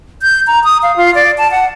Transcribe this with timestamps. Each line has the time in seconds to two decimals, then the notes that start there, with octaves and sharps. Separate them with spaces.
0.22 G6
0.47 A#5
0.64 D#6
0.83 F5
0.97 F4
1.15 D5
1.38 A5
1.51 F#5